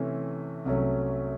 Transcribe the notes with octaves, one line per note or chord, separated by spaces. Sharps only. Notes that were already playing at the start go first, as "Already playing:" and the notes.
Already playing: C3 E3 A3 C#4
C2 C3 F#3 A3 C#4